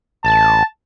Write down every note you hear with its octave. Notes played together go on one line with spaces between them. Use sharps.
A1 A5